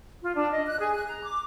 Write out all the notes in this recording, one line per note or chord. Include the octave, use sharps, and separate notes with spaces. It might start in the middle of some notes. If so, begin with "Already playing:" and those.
F4
D4
D#5
F#6
G#4
F#6
A#5
D6